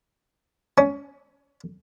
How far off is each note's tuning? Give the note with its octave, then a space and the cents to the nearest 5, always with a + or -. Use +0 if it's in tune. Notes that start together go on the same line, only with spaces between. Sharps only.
C#4 +20